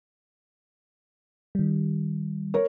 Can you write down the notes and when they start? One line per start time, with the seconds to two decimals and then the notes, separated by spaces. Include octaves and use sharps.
1.55 D#3 G3
2.54 A#4 C#5